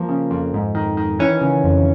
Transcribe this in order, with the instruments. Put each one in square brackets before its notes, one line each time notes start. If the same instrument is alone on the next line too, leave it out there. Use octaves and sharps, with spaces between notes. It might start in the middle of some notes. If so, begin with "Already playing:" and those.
Already playing: [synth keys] F3 A#3
C#3
F2
G#2
D#3
D#3
E3 C#4
C#3
F2